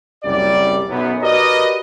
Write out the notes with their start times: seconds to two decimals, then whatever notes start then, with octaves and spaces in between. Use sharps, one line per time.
0.24 F#1 C2 F#2 G3 D5
0.90 B1 F#2 F#3 B3
1.22 F#4 G4 A#4 B4 D5 D#5